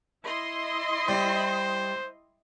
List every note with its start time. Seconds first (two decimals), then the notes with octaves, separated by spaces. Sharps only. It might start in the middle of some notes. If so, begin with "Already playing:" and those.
0.25 E4 D#5 C6
1.08 G3 C5